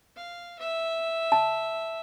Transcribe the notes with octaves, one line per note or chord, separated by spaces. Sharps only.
F5
E5
A5